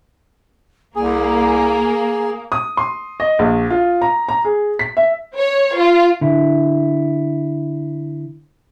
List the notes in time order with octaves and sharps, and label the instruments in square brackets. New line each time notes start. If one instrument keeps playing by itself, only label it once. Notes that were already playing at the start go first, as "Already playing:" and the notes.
[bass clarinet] C2 [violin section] A#3 [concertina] G#4 [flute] G#5
[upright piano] D#6
C6
D#5
A#1
F4
A#5
A#5
G#4
B6
E5
[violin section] C#5
F4
[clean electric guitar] D3 E4